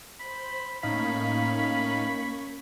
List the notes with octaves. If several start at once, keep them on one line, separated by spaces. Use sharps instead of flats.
C5 B5 C6
A2 A#3 C#4 D#4 F5 B5 C#6 B6